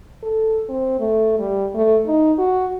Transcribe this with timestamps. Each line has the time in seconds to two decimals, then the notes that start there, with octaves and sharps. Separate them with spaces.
0.23 A4
0.69 C4
0.99 A3
1.39 G3
1.74 A3
2.07 D#4
2.38 F#4